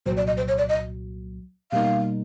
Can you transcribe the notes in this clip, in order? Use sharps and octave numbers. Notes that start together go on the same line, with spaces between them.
C2 A#2 F#3 C5
D5
D#5
C5
C#5
D5
D#5
B2 G3 A#3 D#4 F5